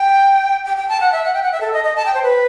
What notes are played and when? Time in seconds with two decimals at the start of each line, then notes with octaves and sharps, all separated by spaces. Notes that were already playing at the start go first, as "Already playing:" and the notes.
Already playing: G5
0.65 G5
0.77 G5
0.89 A5
1.01 F#5
1.12 E5
1.24 F#5
1.34 G5
1.43 F#5
1.52 E5
1.61 A4
1.73 D#5
1.84 D#5
1.96 A5
2.06 G5
2.14 C5
2.23 B4